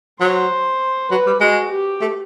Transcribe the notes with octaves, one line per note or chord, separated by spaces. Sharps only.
F#3 C5
F#3 B4
G3
G#3 F#4
G4
A3